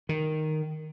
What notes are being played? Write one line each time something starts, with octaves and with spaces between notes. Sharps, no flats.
D#3